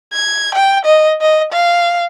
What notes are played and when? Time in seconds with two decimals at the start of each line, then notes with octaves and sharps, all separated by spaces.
0.13 G#6
0.55 G5
0.85 D#5
1.21 D#5
1.52 F5